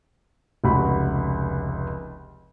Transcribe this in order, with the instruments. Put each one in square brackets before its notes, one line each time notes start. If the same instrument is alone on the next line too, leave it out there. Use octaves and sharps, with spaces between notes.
[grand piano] F1 C#2 F#4 B5